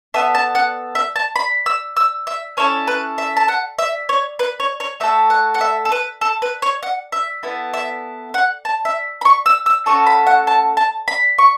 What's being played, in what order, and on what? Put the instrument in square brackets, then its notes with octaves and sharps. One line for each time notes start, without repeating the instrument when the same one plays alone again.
[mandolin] B3 A4 E5
A5
F#5
E5
A5
B5
E6
E6
E5
C#4 E4 A4 C#5
B4
E5
A5
F#5
E5
C#5
B4
C#5
C#5
A3 F#4 A4 E5
F#5
F#5
E5
A4
B4
A4
B4
C#5
F#5
E5
B3 E4 A4
E5
F#5
A5
E5
B5
C#6
E6
E6
A3 C#4 F#4 A4 C#6
B5
F#5
A5
A5
B5
C#6